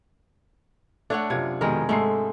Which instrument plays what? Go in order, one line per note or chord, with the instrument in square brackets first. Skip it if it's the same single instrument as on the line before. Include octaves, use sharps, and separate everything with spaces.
[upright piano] A3 [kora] D4 C#5 F#5
[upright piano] F#2 F4 G#6 [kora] C3
[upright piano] F2 B2 D#3 [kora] G#3 A#4
[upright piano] G#2 A4 C7 [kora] G#3 A3